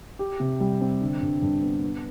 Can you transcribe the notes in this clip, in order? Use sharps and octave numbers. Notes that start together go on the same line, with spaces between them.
G4
C3
G3
C4
D3
G2
G2
B3
B3